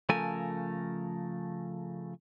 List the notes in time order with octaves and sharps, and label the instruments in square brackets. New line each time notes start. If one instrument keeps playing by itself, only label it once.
[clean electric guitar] C#3 F3 A3 A4 A#4 G#5